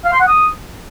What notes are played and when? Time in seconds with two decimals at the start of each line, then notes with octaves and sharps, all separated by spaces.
0.05 F5
0.13 C6
0.20 F#5
0.28 D#6